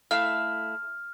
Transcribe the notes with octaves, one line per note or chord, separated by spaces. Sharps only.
A3 E4 F5 F6